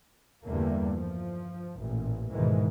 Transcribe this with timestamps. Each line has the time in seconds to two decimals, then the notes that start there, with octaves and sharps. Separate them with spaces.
0.45 E2 G2 D3 G3 A3 A#3
0.94 F3
1.76 A1 A#2
2.33 D2 G#2 B2 D#3 E3 G#3